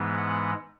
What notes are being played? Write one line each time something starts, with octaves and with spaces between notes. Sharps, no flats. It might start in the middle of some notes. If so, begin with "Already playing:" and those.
Already playing: G#2 E3 G#3 B3
F#5